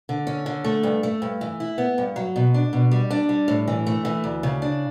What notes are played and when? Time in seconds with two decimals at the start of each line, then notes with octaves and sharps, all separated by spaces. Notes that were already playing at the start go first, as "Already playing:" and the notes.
0.09 D3
0.27 C#4
0.46 D3
0.64 A3
0.83 G2
1.03 A3
1.22 G2
1.41 E3
1.60 E4
1.78 B3
1.98 G2
2.16 F#3
2.36 B2
2.54 D4
2.73 B2
2.92 G3
3.10 D4
3.29 G3
3.48 A2
3.68 E3
3.86 A3
4.05 E3
4.24 D2
4.43 C#3
4.62 D4